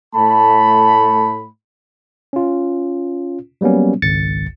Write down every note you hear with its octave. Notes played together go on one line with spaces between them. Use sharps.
A2 A3 A5 B5
C#4 F4
F#3 G3 A#3 B3 C#4
G#1 C#2 A6 C#7